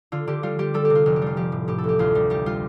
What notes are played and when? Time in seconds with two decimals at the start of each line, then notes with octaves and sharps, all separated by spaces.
0.12 D3 F4
0.27 D3 G4
0.43 G3 F4
0.59 G3 G4
0.74 G3 A4
0.85 G4
0.90 C3
0.95 F4
1.06 F1 F4
1.16 G4
1.22 G3 F4
1.37 F3 G4
1.52 A2
1.68 A2 G4
1.78 A4
1.84 A1 G4
1.99 D2 F4
2.15 G3
2.30 G3 G4
2.46 G3 F4